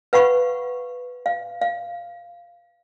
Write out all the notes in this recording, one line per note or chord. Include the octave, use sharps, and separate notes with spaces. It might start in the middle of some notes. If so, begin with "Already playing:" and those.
B4 F5 F#5 B5 C#6
F5
F5